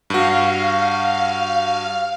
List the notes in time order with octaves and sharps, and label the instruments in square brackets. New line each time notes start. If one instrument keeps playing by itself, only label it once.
[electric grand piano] G2 F#4 [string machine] F5